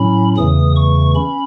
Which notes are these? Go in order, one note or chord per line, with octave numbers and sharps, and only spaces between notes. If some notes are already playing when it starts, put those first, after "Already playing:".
Already playing: A2 F#3 C#4 B5
E2 C#3 E3 A3 D#6
C#6
C#4 B5